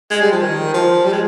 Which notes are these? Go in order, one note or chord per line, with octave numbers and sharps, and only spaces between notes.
G#3
G3
F3
D#3
F3
G3
G#3